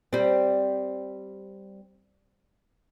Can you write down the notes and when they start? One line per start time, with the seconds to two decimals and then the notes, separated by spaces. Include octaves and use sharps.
0.13 G3 C4